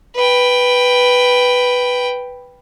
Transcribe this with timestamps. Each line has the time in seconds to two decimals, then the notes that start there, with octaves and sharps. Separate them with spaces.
0.15 B4 G5